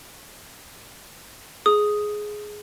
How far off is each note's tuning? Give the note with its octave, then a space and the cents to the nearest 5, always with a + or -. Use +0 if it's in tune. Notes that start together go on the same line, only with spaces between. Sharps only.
G#4 +10 D#6 +0